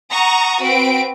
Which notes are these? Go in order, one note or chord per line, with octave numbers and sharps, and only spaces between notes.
F#5 A#5 C#6 D#6
C4 F#4 B4 D7